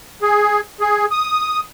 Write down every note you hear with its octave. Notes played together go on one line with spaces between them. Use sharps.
G#4
G#4
D#6